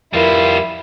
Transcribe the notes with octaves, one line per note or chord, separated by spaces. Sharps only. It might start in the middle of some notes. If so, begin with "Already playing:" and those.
F2 G3 E4 F4 A#4 B4 E7